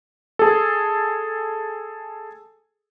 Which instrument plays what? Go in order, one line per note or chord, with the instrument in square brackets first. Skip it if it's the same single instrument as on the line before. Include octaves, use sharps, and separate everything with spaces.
[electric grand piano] G#4 A4